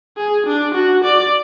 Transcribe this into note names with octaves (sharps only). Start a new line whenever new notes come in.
G#4
D4
F#4
D5